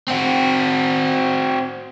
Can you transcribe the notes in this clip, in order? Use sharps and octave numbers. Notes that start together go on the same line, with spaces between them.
C4 F#4